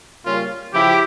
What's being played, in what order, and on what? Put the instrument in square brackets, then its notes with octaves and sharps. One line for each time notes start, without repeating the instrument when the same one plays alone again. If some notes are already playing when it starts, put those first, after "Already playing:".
[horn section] C#3 G3 A#3 C#4 F4
C#3 F3 E4 G4